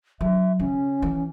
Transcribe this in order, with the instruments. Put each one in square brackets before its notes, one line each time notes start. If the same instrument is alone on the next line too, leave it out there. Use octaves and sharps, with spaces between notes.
[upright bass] F#3 [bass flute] E5
[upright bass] C#3 [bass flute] C#4
[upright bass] E3